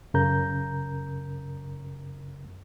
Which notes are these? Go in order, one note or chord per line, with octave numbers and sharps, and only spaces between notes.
F#2 C#3 A#4 A#5 G6